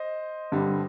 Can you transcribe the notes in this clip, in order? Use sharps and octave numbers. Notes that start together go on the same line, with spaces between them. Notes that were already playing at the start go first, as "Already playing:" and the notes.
Already playing: C5 D#5
G2 D3 G3